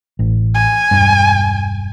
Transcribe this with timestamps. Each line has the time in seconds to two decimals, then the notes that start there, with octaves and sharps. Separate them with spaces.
0.19 A1
0.55 G#5
0.91 E1 G2